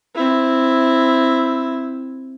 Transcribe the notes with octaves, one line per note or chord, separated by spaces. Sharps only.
C4 E4